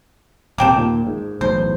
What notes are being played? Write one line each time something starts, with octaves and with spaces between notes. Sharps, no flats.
D#1 C3 A#3 G5 A5
D#2 A#2
G#2
B1 E2 A2 C5